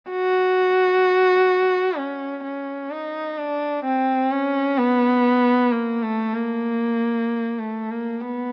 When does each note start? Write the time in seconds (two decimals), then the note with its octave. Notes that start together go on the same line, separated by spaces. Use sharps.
0.10 F#4
1.98 C#4
2.44 C#4
2.91 D#4
3.38 D4
3.85 C4
4.31 C#4
4.78 B3
5.71 A#3
6.02 A3
6.34 A#3
7.59 A3
7.90 A#3
8.21 B3